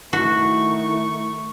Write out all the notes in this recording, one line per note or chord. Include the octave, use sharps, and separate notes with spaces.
D#3 A3 E4 F#4 C#6